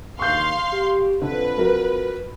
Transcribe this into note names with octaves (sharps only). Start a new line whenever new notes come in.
D#2 F5 C6 C#6 G6
G4
F2 D3 B4
F#3 A#4